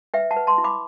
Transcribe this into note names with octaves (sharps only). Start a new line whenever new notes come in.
B4 E5 G5
F#5 A5
B4
A5 C6
E4
B5 D6